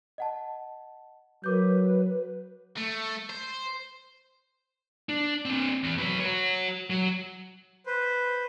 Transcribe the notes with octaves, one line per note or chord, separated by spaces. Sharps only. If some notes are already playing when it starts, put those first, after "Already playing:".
D#5 F#5 A5
F#3 A#4 B4 D6 G6
A3
C5
D4
C4 D4
E2
F#3 B4
F#4 C#5
F#3
B4 C5